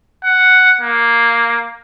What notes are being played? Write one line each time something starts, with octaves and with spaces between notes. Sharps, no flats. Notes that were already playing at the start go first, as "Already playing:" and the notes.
F#5
A#3